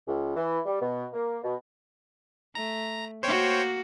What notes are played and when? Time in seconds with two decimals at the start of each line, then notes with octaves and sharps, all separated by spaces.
0.08 C#2
0.36 E3
0.65 G3
0.81 B2
1.13 A#3
1.44 B2
2.55 A3 A#5
3.23 A#3 F#4 C5 C#5 G5